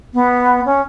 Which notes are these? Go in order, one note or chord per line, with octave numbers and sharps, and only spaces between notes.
B3
C#4